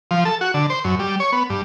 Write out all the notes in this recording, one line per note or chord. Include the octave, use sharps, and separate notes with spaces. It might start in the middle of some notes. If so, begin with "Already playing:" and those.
F3
A4
F#4
D3
C5
F#2
G3
C#5
B3
G2